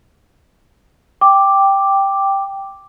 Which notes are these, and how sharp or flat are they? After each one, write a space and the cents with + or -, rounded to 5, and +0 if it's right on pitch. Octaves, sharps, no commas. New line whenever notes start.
G5 +0 D6 +0